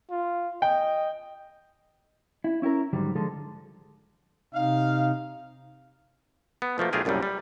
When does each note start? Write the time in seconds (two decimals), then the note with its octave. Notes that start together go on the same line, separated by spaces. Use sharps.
0.11 F4
0.62 D#5 G5
2.44 E4
2.62 C#4 E4 F#4 A#4
2.93 G#2 D3 D#3 F#3 G3
3.15 D3 F3 G#3 A4
4.54 C3 D#4 F5
6.62 B3
6.78 B2 F3 A3 A#3
6.93 B1 A3 F4 G4 G#4 A#4
7.05 C2 F#2 A#2 F#3 G3
7.23 G3